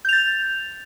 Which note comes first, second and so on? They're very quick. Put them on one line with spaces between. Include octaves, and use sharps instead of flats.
G6 F7 A6